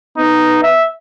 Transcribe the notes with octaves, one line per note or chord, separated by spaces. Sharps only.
B3 D#4
E5